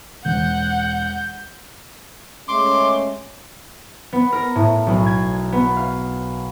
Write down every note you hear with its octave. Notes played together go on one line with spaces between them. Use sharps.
E1 F#5 G6
G#3 A3 C#4 C6 D6
B3
A#4
A2
B1
G#6
B3
F5